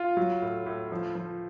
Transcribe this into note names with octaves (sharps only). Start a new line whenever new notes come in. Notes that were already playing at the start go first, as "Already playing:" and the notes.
Already playing: F4
F#3
A2
A2
F3
F3